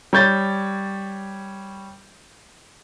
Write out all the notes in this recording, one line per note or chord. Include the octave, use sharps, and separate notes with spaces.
G3 C#5 G6 A6